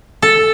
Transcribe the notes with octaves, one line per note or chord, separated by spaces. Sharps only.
A4